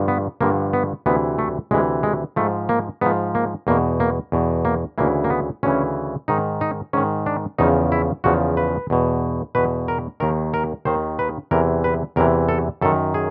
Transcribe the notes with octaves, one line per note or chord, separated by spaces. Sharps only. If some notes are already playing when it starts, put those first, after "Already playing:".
Already playing: G2 D3 F3
B3
G2 D3 F3 A#3
B3
D2 C3 E3 B3
A3
D2 C3 E3 G#3
G#3
G#2 F3 A3
A#3
G#2 F3 B3
A#3
E2 B2 A#3
A#3
E2 B2
A#3
D2 C#3 E3 A#3
A#3
B3
D2 C#3 E3 C#4
G#2 D#3 D#4
D#4
G#2 D#3 C#4
D4
E2 C#3 F3 D#4
E4
E2 C#3 F3 F#4
B4
E2 B2
E2 B2 B4
A#4
D#2 D#3 A#4
A#4
D#2 D#3 C5
B4
E2 C3 E3 A#4
B4
E2 C3 E3 A#4
A4
F#2 D#3 A4
G#4